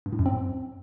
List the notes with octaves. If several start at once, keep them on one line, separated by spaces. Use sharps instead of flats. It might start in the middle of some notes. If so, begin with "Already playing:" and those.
G2
A2
F#2
C4